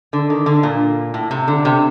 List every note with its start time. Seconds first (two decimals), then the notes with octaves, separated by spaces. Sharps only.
0.13 D3
0.30 D#3
0.46 D3
0.63 A#2
1.14 A2
1.31 C3
1.48 D3
1.65 C3